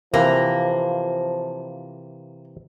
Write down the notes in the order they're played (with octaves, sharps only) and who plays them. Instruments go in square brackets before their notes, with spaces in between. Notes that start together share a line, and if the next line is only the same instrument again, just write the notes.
[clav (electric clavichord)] C3 E3 [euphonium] F3 [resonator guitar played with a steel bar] A#3